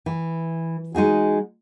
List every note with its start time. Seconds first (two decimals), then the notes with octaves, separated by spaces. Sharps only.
0.06 E3
0.95 G#3 D#4 F#4 G#4